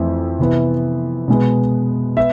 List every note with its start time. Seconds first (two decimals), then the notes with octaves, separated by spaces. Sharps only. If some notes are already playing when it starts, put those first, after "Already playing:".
Already playing: F2 E3 A3 C4
0.39 C3 E3 B3
1.28 B2 G#3 B3
2.17 B3 E5